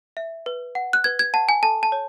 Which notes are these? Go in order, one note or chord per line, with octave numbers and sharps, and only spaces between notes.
E5
B4
F#5
F#6
B4 G#6
G#6
F#5 A5
G#5
A4 A5
A5
C#5